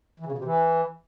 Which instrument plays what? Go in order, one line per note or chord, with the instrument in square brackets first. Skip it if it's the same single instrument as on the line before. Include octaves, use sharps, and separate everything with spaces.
[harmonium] E3
C#3
B2
C3
E3